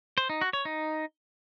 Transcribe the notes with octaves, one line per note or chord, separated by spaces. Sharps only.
C5
D#4
F#4
C#5
D#4